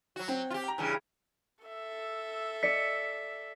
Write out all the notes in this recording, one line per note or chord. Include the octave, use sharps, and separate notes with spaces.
F#3 F#4
C4
F4 G4
G5 A#5
G2 C#3 E3
A4 E5
D5 B6 C#7